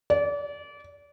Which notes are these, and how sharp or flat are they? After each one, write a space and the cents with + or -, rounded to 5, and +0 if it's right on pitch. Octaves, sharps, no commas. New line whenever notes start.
D5 -30